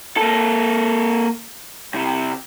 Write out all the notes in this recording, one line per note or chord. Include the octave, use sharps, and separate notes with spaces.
A#3 A4
C2 C3